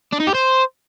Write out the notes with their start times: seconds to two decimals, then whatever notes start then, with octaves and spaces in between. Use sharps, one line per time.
0.13 D4
0.20 D#4
0.27 G4
0.35 C5